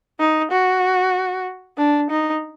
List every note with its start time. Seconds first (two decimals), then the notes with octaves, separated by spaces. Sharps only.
0.20 D#4
0.52 F#4
1.78 D4
2.10 D#4